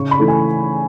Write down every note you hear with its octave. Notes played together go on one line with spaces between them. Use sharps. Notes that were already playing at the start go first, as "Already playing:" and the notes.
Already playing: C#3 C#6
B5
E3 A3
G#5